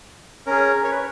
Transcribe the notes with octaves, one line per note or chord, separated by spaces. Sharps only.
C#4 G#4 A#4
C#5
B4